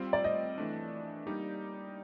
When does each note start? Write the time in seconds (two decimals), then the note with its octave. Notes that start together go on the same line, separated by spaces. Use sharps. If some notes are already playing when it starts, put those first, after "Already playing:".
Already playing: G3 C4 F4
0.13 D5
0.24 D#5
0.58 E3 A3 D4
1.27 G3 A#3 D#4 G4